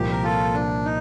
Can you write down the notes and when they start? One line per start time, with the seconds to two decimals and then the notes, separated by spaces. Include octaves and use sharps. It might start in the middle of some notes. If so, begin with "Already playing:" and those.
Already playing: C2 A#2 F3 A#3 G4
0.11 A#4
0.23 F4 A4
0.54 D4
0.85 D#4